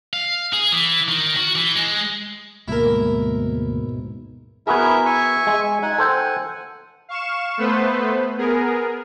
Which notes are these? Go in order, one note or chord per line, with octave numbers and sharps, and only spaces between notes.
F5
G#4
E3
D#3
F#4
E3
G#3
D2 G#2 B2 G#3 A#3 E4 A#4
B3 E4 F#4 G#4 A#4 E5
E5 G#5 C#6
G#3
D#4 F#5 G#5
A4 C5 G5
F5 C#6 E7
A3 B3 B4 C5
B3 G#4 A#4